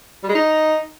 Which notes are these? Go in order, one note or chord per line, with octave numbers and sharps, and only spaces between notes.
G3
G#3
D#4